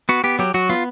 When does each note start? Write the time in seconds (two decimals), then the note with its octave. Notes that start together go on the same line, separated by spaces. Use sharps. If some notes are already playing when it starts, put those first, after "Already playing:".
0.09 B3 F#4
0.24 B3 G4
0.39 F#3 G4
0.54 F#3 F#4
0.69 B3 F4